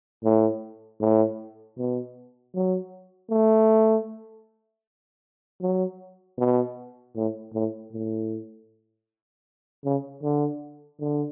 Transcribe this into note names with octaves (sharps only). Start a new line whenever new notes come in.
A2
A2
B2
F#3
A3
F#3
B2
A2
A2
A2
C#3
D3
D3